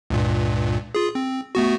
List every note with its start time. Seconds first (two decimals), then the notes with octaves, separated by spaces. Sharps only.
0.10 C#2 G2 A#2
0.95 F4 G#4
1.15 C4
1.55 A3 B3 F#4